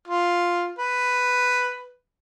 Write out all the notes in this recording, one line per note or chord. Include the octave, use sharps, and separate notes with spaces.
F4
B4